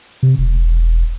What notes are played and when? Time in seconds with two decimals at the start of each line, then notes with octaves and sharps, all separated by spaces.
0.23 C3
0.38 E1